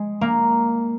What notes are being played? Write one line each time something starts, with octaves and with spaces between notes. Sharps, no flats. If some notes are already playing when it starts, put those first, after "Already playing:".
Already playing: G#3
A#3